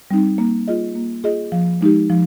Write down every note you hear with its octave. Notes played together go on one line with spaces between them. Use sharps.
G3 C4 D#4
A#3
F4 G#4 D#5
A#3
F4 G#4 D#5
F3
G#3 D#4 G4
F3